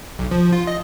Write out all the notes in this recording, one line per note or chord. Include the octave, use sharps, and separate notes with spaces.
B1
F3
F4
D#5